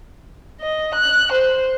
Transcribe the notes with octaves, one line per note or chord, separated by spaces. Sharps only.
D#5
F#6
C5